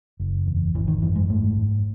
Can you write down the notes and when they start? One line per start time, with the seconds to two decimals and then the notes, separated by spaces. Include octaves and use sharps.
0.20 F#1
0.47 E2
0.75 G#1 E3
0.88 D#3
1.02 F#2 E3
1.16 G#3
1.30 G#2 A3
1.57 G#2